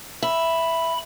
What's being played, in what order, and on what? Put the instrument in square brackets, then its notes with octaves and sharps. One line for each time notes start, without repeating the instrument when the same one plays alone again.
[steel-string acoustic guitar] E5 [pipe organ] B5